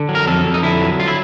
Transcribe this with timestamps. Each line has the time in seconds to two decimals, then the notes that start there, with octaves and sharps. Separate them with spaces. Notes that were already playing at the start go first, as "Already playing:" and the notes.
Already playing: D3
0.09 F#3
0.15 A#4
0.27 F2 A4
0.45 F2
0.54 D#4
0.63 D3 E4
0.81 F#3
1.00 F4
1.08 E4